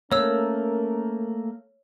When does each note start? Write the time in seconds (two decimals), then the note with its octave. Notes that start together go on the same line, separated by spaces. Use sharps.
0.12 A3 A#3 C#4 A#4 C#5 E6